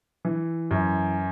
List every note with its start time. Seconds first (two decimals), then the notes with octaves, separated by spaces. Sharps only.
0.25 E3
0.71 F#2